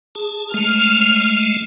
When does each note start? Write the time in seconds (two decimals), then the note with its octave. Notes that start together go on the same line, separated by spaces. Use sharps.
0.15 G#4 A5
0.54 G#3 A3 F6